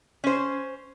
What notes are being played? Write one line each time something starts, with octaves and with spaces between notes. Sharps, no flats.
C#4 C5